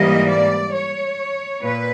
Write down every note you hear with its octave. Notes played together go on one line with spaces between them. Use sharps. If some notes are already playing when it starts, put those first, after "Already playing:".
Already playing: G#2 E3 G3 A#3 D#5
D5
C#5
A#2 B4